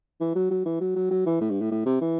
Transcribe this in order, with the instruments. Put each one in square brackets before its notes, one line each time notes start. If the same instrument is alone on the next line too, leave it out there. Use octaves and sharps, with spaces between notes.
[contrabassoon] E3
F#3
F#3
E3
F#3
F#3
F#3
E3
A2
G2
A2
A2
C3
E3